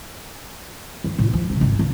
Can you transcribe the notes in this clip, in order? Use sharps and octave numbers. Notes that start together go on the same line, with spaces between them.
F3
A2
F3
C#3 D#4
G#1
C#3